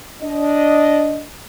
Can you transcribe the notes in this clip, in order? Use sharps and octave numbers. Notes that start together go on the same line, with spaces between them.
D4 D#5